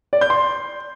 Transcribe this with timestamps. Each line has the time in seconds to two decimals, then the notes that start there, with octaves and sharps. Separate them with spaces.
0.13 D5
0.21 G6
0.30 C6